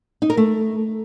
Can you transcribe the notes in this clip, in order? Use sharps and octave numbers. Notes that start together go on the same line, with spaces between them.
D#4
A#4
A3